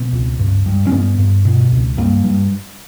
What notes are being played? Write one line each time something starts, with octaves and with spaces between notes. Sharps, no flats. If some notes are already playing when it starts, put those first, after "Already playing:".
Already playing: B2 B3
C#2
G2
G2
C#4
G2 B3
G2
B2
C#2
G2 A#3
G2